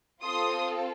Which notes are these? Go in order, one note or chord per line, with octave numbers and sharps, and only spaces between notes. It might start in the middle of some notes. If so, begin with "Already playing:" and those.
C4 F4 A4 C6 D#6